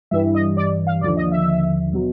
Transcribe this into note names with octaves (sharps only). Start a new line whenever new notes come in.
G2 E3 G3 E5
D#5
D5
F5
D#2 D3 F3 D5
D#5
E5
B2 F#3